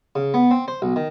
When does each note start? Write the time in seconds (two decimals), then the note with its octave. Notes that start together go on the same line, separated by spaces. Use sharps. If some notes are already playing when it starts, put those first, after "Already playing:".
0.16 C#3
0.34 B3
0.51 C4
0.68 C5
0.82 B1
0.96 D#3